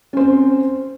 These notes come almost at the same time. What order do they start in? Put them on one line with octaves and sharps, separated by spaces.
C#4 C5 C4